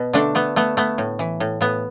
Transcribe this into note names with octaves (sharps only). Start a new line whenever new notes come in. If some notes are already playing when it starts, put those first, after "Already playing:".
Already playing: B2 B3
D3 A3 D4
A3 B3
A3 B3
A3 B3
A2
E3
A2
A2 B3